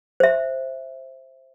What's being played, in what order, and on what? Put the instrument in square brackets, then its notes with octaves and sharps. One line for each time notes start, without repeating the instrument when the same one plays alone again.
[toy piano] C5 E5